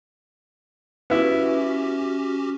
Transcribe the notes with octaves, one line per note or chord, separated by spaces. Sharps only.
B3 C#4 E4 F#4 G4